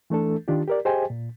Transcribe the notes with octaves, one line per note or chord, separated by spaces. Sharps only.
E3 A3 D4 A4
D#3 D4 F4 G4
G4 A#4 D5
G4 G#4 C5 D#5 G5 G#5
A#2